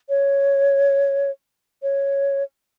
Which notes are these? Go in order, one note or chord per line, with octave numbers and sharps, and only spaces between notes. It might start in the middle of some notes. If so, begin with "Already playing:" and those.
C#5
C#5